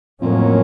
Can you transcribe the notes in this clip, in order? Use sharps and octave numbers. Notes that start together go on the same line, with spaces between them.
F2 A2 F#3 A#3 C#4